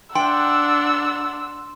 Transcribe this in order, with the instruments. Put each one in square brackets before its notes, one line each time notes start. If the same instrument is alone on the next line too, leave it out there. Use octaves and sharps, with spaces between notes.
[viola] D4 F#5 [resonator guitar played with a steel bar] G5 [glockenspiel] C6 [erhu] E6